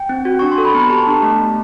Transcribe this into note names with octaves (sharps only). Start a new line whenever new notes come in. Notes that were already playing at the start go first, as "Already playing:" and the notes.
Already playing: G5
C4
F#4
D4 C#6
C6
A4
B5
B3 A#5
G4 A5
D4
A3
A3